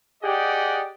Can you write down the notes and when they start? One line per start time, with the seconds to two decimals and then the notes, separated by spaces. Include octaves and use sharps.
0.23 G4 G#4 D5 D#5 F#5